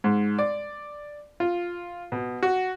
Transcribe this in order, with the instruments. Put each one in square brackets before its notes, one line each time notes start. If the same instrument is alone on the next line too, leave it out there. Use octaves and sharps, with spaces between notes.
[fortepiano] G#2
D5
F4
B2
F#4